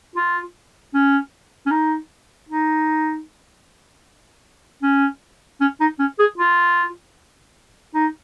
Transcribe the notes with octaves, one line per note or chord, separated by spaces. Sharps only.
F4
C#4
C#4
D#4
D#4
C#4
C#4
D#4
C#4
G#4
F4
D#4